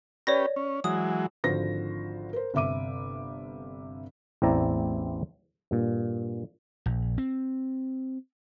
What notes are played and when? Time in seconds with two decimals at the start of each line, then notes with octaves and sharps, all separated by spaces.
0.27 C#4 G4 B4 C#5 D5 A#6
0.56 C#4
0.84 E3 F#3 G#3 D#6
1.44 G#1 D3 F3 F#4 C5 A#6
2.33 A#4 C5
2.54 G1 C3 E5 D6 D#7
4.42 A1 E2 C4 E4 D5 A#5
5.71 G2 A#2
6.86 A#1
7.18 C4